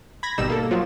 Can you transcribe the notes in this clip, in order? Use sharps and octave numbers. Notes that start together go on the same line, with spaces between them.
B5 G#6 A#6
G#1 B2 G3 D#4 E6 E7
A#3 A4
F3 F#3 F4